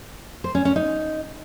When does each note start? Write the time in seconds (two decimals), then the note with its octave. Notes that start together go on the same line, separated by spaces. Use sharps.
0.44 C5
0.55 C#4
0.65 C#4
0.76 D#4